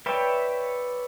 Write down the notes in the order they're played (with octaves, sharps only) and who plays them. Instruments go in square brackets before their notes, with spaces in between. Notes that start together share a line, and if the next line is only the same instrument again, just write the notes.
[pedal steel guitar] B4 C#5 D5 E5 G5